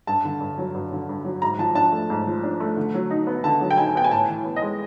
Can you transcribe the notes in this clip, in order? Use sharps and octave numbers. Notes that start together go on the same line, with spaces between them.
G2 A5
D3
G2
F#3
G2
D3
G2
F#3
G#2 A#5
F3 A5
D4 A5
A3
G#2
F3
D4
A3
D3
F#3
D#4
B3
D3 A5
F#3
G5
D#4 G#5
B3 G5
G#5
A2 A5
E3
B3
D#5
G#3